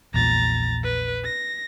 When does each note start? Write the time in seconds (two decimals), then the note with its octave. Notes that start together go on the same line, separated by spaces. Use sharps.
0.14 A#1 E2 A#2 A#5 A6
0.83 B4
1.24 A#6